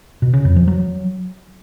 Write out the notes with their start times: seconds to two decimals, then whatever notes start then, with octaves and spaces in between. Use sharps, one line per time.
0.22 B2
0.33 C#3
0.45 F2
0.56 F3
0.68 F#3